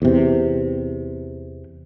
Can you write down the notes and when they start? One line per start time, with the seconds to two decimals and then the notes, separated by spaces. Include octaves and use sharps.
0.02 E2 C3